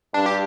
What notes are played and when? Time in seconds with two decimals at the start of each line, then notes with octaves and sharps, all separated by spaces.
0.14 G2 D4
0.26 G4